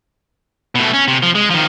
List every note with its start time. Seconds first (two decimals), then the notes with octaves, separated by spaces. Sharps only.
0.75 B2 A3
0.93 C#4
1.08 C3
1.23 F3
1.35 G#3
1.50 D#3 F3